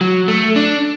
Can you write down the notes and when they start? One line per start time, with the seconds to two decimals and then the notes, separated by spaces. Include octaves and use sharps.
0.01 F#3
0.28 A3
0.56 D4